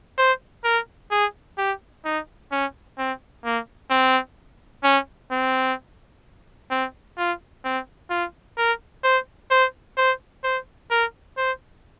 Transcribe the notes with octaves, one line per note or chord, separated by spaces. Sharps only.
C5
A#4
G#4
G4
D#4
C#4
C4
A#3
C4
C#4
C4
C4
F4
C4
F4
A#4
C5
C5
C5
C5
A#4
C5